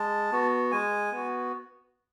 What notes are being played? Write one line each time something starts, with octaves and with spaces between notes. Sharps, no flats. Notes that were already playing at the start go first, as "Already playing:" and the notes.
Already playing: G#3 A5
B3 F#4
G#3 G#5
B3 F#4